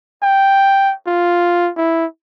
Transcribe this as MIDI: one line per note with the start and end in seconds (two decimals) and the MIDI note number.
0.23 0.94 79
1.07 1.71 65
1.77 2.06 64